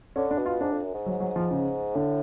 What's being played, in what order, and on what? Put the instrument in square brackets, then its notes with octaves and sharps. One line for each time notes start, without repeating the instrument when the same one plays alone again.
[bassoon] D3 [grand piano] C#4
[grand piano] D4
[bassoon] B2
[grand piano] F4
[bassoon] G#2 [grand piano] D4
[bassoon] F2
F#2
G#2
[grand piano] F#3
F#3
F3
C#3
[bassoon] A2 [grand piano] D3